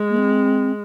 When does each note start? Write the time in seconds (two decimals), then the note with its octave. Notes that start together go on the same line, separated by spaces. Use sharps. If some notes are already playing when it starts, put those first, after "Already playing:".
Already playing: G#3
0.10 A#3
0.18 C4